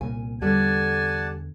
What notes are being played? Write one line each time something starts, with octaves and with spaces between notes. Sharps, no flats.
C2 A#2 G#5
E2 D3 G3 A4 D5 F#5 G#5 A5